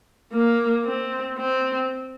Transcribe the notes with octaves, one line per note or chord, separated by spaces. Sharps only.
A#3
C4
C4